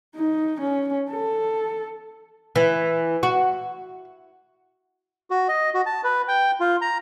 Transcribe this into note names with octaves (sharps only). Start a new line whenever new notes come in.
D#4
C#4
A4
E3
F#4
F#4
D#5
F#4
A5
B4
G5
F4
A#5